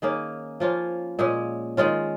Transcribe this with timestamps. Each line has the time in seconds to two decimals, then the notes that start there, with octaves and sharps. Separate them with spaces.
0.02 D#3 A#3 C#4 G#4
0.60 F3 A#3 C#4 F4
1.19 A#2 G#3 C#4 G#4
1.77 D#3 G#3 C#4 F4